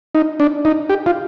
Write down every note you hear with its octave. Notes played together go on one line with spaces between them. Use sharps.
D#4
D4
D#4
G4
F4